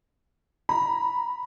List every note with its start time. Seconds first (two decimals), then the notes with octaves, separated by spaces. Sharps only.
0.69 A#5 B5